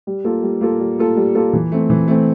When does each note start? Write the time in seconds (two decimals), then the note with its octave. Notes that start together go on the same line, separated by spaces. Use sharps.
0.07 G3
0.24 A#3 F4 A4
0.43 G3
0.61 A#3 F4 A4
0.80 G3
0.98 A#3 F4 A4
1.17 G3
1.35 A#3 F4 A4
1.53 E3
1.72 A3 C4
1.90 E3
2.08 A3 C4